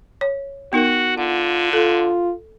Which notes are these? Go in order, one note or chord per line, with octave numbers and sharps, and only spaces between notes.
C#5
B3 D#4 F#4 A#4
D3 F4 F#5
F4 A4